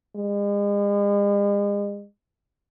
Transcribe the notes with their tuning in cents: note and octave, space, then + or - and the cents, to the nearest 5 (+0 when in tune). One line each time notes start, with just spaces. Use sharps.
G#3 -40